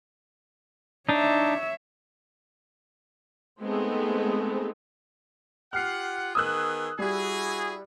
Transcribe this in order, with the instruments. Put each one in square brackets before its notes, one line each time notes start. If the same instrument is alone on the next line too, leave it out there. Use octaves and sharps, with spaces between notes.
[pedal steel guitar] D4 D#4 [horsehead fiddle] C#5 E5
[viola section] G#3 A3 B3 C4 D#4 G#4
[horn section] F4 G4 F#5 [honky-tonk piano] F6 C7
[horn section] D#3 B3 G#4 [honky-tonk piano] D#6 E6 F#6
[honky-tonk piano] G3 [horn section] E4 F#4 G#4